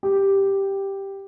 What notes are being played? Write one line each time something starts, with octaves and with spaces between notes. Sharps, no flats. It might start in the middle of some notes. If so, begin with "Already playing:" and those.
G4